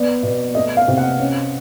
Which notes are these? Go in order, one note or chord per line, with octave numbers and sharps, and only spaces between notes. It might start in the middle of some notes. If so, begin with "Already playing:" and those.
Already playing: B3 D5
B2
A3 D#5
F5
C3
F#5
C#4